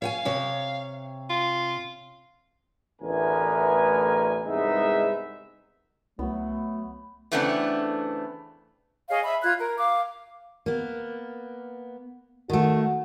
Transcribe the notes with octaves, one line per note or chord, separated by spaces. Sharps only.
C#5 F5 F#5 G#5
C3 C#5
F4
A1 D2 E3 B3 A#4 G#5
C2 G#2 G#3 B3 D#4 E5
C2 F#3 A3 B3
C#3 E3 A3 B3 C4 D4
G#4 C#5 D#5 F5
E5 B5
F4 F#6 G#6
A#4
F5 D6
A#3 B3
D#3 A3 F#4